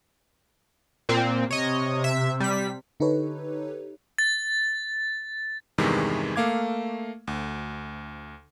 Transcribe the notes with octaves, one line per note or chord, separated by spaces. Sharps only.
A#2 C4
C3 C#5 D#5
E5
G3 B6
D3 D#4 G4 A4 B4 C#5
A6
E2 G2 C3 D#3 E3 G#3
A3 A#3 F5 D6 G#6
D2